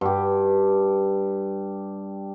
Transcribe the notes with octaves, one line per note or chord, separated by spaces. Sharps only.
G2 G4